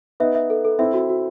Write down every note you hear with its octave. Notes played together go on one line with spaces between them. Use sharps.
B3 D#4 E5
E5
A4
A4
C4 E4 E5
F#4
F#4